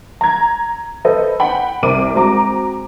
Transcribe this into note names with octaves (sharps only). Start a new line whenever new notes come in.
A#5 G#6
A4 B4 C5 D#5
F#5 G5 B5
C2 C4 A#4 D6 D#7
G#3 C4 F#4 A#5 D6